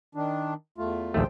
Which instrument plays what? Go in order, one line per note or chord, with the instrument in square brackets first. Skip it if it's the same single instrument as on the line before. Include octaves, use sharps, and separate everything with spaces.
[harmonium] D#3 D4
E2 A3 F4
[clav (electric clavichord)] A#1 D#2 A3 [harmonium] C5 G5